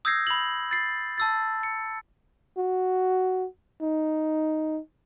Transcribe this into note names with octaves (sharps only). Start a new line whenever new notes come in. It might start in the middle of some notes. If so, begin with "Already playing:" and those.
D#6 E6 G6 G#6 A#6 C7
B5 F#7
A6 C7
A5 E6 A6
C#7
F#4
D#4